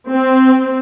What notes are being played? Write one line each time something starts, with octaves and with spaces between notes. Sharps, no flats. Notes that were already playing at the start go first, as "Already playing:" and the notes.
C4